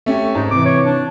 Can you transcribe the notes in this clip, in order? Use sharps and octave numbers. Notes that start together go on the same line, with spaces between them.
A3 C#4 G4
G#2 D#4
C3 E3 D6
C#5
D4